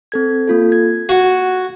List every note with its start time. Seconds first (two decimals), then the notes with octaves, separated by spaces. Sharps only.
0.12 C4 A4 G#6
0.47 A#3 F4 A4
0.72 G#6
1.09 F#4